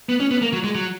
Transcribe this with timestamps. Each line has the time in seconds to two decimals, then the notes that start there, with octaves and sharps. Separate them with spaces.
0.09 B3
0.20 C#4
0.31 B3
0.42 A#3
0.53 F#3
0.64 G#3
0.75 F#3